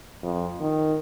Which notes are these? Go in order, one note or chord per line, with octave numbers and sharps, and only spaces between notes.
F2
D#3